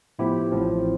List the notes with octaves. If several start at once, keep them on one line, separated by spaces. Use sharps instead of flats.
A2 F3 B3 E4 G4
A1 A2 F3 C4